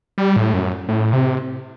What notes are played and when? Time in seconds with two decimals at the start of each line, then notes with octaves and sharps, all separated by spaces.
0.18 G3
0.36 A2
0.53 F#2
0.88 A2
1.13 C3